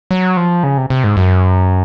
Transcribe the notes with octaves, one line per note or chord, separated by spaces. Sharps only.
F#3
F3
C#3
C3
C3
G#2
F#2